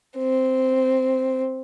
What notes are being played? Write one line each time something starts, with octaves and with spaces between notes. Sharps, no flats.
C4